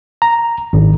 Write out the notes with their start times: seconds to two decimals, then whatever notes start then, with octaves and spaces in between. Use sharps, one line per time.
0.22 A#5
0.73 G#1